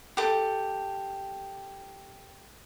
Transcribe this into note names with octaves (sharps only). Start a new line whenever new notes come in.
G4 A4